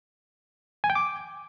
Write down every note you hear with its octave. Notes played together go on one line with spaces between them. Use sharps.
G#5
G5
D6